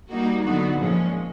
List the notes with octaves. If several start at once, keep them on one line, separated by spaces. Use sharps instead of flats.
G3 A#3 D#4 F#4
D3 F#3 B3 D#4 F#4
A#2 F3 G#3 C#4